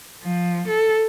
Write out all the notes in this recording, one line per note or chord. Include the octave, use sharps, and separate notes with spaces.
F3
A4